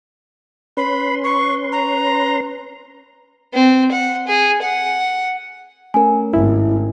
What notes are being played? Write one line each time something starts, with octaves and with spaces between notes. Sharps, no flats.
C#4 B4 B5 C6
C#6
A#5
C4
F#5
G#4
F#5
A3 C#4 A#4 G#5
G#1 E4